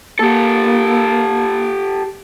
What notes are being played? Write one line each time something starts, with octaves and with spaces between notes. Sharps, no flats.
A#3 G4 A4